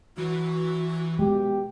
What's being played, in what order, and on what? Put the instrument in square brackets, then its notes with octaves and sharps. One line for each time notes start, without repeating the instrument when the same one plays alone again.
[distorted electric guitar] E3 B4 [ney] F#4
[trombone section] B2 G4 [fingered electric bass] G#3